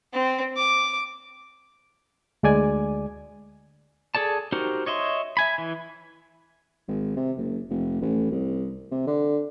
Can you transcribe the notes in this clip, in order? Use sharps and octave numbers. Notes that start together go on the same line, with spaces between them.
C4
D6
D2 G#3 D5 G#5
G#4 A4 D5 A5
D#4 F#4 G4 A#4 C5
C#5 D#5 E5 C6
E5 G#5 B5
E3
G#1
C3
F#1
F1
A1
C2
C3
D3